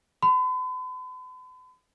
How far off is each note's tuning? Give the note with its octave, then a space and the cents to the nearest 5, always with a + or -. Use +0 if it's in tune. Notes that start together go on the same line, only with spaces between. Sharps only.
B5 +45